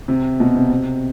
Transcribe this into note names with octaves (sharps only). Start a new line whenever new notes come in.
C3
B2
C3
C3